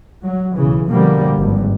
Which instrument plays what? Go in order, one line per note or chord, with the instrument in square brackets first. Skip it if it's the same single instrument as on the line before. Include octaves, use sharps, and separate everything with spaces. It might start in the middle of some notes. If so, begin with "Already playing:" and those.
[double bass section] F#3
B1 C#3 E3
B2 D3 F3 G3 A#3
G#1 G2